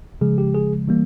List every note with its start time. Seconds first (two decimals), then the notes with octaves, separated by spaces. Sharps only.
0.21 C#3 F3 G#3 G#4
0.38 G4
0.55 G#4
0.88 E3 G3 A#3